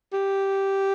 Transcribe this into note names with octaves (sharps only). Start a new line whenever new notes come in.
G4